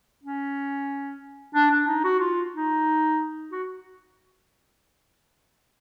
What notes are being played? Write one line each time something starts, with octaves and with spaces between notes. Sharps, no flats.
C#4
D4
D4
D#4
F#4
F4
D#4
F#4